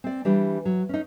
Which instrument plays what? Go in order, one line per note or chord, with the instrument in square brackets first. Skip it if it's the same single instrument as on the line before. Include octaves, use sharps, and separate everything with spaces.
[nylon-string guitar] C4 D5
E3 G3 D4
F#3
C#4 D#4